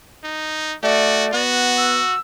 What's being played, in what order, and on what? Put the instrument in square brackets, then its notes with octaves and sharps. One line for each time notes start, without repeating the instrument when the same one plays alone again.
[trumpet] D#4
[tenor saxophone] A3 [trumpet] F#4 [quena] D5
[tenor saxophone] B3 [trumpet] F#4
[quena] E6